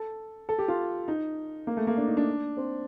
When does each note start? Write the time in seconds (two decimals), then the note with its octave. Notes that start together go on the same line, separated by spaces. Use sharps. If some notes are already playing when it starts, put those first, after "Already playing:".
Already playing: A4
0.49 A4
0.59 G4
0.68 F4
1.08 D#4
1.67 A#3
1.77 A3
1.87 A#3
1.97 D4
2.07 D#4
2.17 D4
2.57 C4